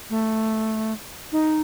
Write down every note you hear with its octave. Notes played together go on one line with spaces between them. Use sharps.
A3
D#4